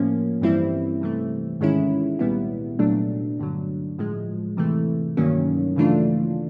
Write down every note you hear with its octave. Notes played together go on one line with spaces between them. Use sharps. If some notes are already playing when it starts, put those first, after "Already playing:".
Already playing: A2 F3 A#3 C#4
G2 E3 G3 C4 E4
C3 E3 A3
G#2 D#3 G#3 C#4 E4
C2 A#2 G3 B3 E4
C2 A#2 F#3 A3 D4
G2 D3 F#3
A2 F3 G#3
C3 E3 A3
G2 D#3 F#3 A#3 C#4
C#3 E3 A3 D4 F4